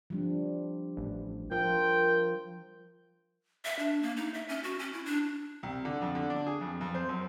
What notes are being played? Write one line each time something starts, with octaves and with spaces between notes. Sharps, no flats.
F3 G3 D4
A1
F3 F4 A#4 G5
E5
D4
A#3
D#4
E5
C#4
F#4
C#4
E4
D4
C2
D3
F2
D3
D4
G#4
F2
F2
C5
F#2